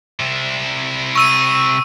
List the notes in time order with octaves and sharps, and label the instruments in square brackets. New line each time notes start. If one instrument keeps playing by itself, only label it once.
[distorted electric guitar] C3 E4
[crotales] C#6 E6 D#7